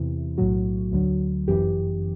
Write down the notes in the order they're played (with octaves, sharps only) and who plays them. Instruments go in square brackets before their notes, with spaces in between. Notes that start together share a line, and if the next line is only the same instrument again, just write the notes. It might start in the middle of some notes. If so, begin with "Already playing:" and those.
Already playing: [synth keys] E2 C3 E3 E4
B1 A2 F#3 F#4
D2 D3 F#3
G1 F#2 E3 G4